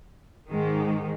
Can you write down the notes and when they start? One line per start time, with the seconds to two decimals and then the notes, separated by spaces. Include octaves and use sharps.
0.50 G#2 D#3 G#3